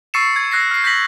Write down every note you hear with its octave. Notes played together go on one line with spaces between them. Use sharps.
C#6 E6 A6 C7 C#7 E7
G#6
E6 F#6 A#6 C7
F6 C7
G6 A#6 B6 F#7